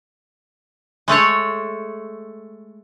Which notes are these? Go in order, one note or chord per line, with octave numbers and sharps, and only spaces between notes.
G#3 A3 G#4 C#5